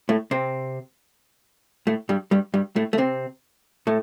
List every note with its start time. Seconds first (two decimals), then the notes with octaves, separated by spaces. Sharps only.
0.09 A2 A3
0.31 C3 C4
1.87 A2 A3
2.09 G2 G3
2.31 G2 G3
2.54 G2 G3
2.76 A2 A3
2.93 A3
2.98 C3 C4
3.87 A2 A3